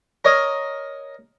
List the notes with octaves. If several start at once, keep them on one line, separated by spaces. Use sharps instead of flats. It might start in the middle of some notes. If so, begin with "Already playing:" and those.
A#4 C#5 D#5